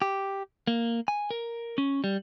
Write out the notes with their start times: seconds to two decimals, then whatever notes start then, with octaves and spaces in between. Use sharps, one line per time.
0.02 G4
0.67 A#3
1.08 G#5
1.31 A#4
1.78 C#4
2.04 G3